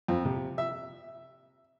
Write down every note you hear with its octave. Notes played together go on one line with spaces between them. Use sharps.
F2
C3
E5